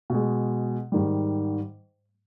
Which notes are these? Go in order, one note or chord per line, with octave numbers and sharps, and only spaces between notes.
B2 G#3
G#2 D#3 G3